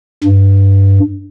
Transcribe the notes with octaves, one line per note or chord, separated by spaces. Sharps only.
G2